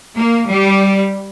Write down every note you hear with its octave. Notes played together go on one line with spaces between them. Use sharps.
A#3
G3